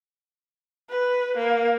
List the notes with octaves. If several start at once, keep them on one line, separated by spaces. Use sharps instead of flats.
B4
A#3